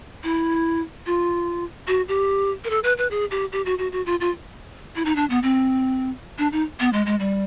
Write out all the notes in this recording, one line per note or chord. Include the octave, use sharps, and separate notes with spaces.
E4
F4
F#4
G4
A#4
A4
B4
B4
G#4
G4
G4
F#4
F#4
F#4
F4
F4
E4
D#4
D4
B3
C4
D4
D#4
B3
G#3
G#3
G3